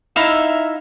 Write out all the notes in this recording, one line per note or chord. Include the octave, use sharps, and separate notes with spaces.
D#4 E4 E5 F5